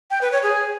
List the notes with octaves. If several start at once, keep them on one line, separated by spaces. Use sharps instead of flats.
G5
B4
C#5
G#4